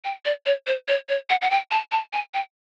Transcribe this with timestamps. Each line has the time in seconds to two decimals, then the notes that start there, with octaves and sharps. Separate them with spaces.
0.05 G5
0.25 D5
0.46 C#5
0.67 C5
0.88 C#5
1.09 C#5
1.30 F#5
1.41 F#5
1.50 G5
1.71 A5
1.92 A5
2.13 G#5
2.34 G5